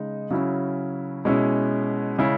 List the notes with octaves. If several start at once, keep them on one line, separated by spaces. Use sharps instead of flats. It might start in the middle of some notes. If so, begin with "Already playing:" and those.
Already playing: C#3 G#3 D#4
C#3 F#3 C#4 E4
B2 G#3 C#4 E4
C#3 G#3 C#4 E4